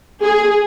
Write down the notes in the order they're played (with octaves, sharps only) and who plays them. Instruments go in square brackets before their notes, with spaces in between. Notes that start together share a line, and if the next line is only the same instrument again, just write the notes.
[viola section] G#4